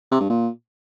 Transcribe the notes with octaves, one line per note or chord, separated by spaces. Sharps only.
C3
G2
A#2